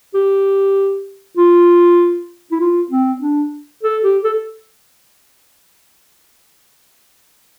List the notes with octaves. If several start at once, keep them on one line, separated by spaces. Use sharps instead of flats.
G4
F4
E4
F4
C4
D4
A4
G4
A4